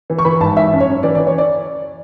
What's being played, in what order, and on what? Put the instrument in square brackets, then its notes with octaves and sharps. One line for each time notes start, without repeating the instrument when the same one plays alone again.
[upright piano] E3
C#6
E3 B5
G#1 A5
E3 E5
F#2
C#5
F#2
E3 D5
D5
E3
C#5
D5